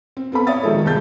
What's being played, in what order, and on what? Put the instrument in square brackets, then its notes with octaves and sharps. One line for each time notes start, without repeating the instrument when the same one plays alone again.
[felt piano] C4
B3 C4 A4 B5
C#5 D5 E5 D#6 A6
D#3 F3 G#3 A4
C2 G#3 A5 G6 A6